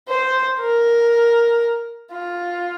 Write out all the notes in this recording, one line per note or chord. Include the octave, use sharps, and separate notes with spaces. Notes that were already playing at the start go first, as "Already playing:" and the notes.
C5
A#4
F4